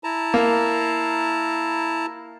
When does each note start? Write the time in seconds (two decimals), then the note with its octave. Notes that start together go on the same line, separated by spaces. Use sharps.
0.04 E4 A5 A#5
0.34 A#3